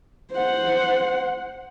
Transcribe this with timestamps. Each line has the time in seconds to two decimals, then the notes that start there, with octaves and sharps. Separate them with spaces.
0.33 C5 F#5